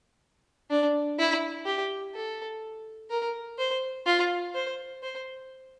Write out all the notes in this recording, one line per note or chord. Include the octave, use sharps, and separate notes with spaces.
D4
E4
G4
A4
A#4
C5
F4
C5
C5